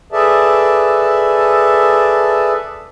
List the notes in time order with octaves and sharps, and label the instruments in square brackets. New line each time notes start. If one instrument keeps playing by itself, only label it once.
[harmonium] G#4 A4 B4 D5 E5 A5